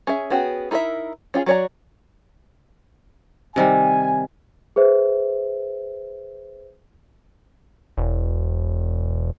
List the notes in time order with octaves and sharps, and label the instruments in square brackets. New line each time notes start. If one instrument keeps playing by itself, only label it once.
[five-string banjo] C#4 G#4 E5
B3 C#4 F#4 G#4 G5
D#4 E4 A#4 C5 E5
C#4 F4 G4 G#4
F#3 F#4 C#5 D5 A#5
[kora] C3 D#3 G3 [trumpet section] G#5
[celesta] G#4 B4 C5 E5
[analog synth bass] E1